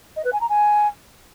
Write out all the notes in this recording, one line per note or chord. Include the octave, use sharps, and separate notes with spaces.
D#5
B4
G#5
A#5
G#5